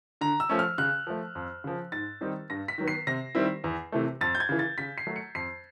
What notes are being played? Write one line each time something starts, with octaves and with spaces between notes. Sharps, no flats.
D3 A#5
E6
F3 A3 C#4
F6
C#3 F#6
F3 A3
F2
C#3 F3
G#2 A6
D#3 G3 C4 D#4
G2 A#6
B6
D#3 F#3 B3
C7
C3 A#6
D#3 G3 C4 E4
E2
C3 E3 A3
F2 A6
G6
G#6
C#3 E3
A6
C#3 B6
C7
F#3 A3
C#7
F2 C7